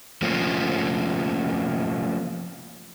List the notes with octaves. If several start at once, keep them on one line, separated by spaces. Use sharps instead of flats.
F3 A3 A#3 C4 C#4